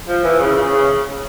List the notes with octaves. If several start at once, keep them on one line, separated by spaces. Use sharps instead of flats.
F3
E3
C#3
C#3
C#3